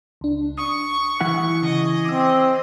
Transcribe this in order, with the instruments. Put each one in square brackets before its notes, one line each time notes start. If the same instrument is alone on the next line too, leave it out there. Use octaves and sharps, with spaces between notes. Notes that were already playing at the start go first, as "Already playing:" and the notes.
[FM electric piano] C#2 D4
[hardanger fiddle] C#6 [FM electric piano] D#6
[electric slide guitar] E3 E4 F#5
[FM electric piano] C#3 [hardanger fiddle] G#4 D#5
[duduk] C4 [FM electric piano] D6 E6